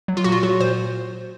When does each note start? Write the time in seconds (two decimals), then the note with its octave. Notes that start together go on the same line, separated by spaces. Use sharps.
0.08 F#3
0.17 F4
0.24 A#2 F#4
0.32 F4
0.43 F#3 F#4
0.60 A#2 C5